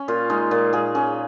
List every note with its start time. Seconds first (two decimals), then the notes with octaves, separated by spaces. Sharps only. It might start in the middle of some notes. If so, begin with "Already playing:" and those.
Already playing: C#4
0.08 A#2 F4
0.30 G#3 D#4
0.51 A#2 F4
0.73 A#2 G#4
0.95 C#4 G#4